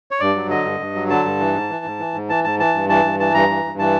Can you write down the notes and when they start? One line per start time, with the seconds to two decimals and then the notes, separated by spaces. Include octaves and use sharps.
0.11 C#5
0.20 G2 D5
0.35 F#3
0.50 D3 D#5
0.65 G2
0.80 G2
0.95 F#3
1.10 D3 A5
1.25 G2
1.40 E3
1.54 G#2
1.70 E3
1.85 G#2
1.99 E3
2.14 G#2
2.29 E3 A5
2.44 G#2 A5
2.59 E3 A5
2.75 G2
2.89 E3 A5
3.05 G2
3.19 E3 A5
3.34 G2 A#5
3.49 E3
3.64 G2
3.79 E3 A5